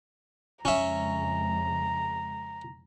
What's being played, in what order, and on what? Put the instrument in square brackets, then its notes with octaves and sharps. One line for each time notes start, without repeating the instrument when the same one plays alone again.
[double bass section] F2 C#3 G#3 [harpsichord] C#4 E5 [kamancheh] A#5